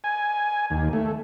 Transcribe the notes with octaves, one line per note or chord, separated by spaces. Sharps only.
G#5
D#2
A3